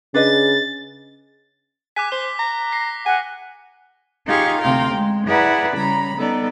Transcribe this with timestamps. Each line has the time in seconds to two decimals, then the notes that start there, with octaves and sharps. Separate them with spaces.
0.14 C#3 D4 B4 D#5 A6
1.96 G#5 D6 F#6 B6
2.12 C5 G7
2.39 A#5
2.72 A#6 C7
3.06 F#5 G#5
4.26 D#4 F4 G4 G#4 F5 C#6
4.61 D2 C3 F5 G5 A#5 C6
4.94 G#3
5.28 E4 G#4 B4 D5 F#5 A#5
5.77 C#3 G3 A#5 B5
6.18 G3 B3 D#4 A4 D5